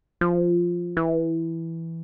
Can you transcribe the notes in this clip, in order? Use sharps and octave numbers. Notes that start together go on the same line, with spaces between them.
F3
E3